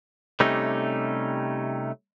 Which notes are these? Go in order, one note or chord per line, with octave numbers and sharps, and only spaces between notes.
C3 G3 A3 C#4 D#4